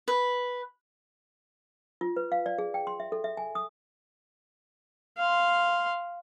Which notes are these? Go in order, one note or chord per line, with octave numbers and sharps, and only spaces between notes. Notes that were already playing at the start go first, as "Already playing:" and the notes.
B4
F4
B4
F5
D5
G#4
G5
C6
E5
A4
E5
G#5
D#6
F5 C6